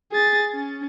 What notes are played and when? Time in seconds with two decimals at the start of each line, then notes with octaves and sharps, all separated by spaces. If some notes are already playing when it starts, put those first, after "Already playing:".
0.12 G#4 A6
0.53 C#4